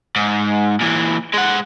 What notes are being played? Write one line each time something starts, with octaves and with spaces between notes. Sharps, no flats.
G#2
A#2 E3
G#3 F#5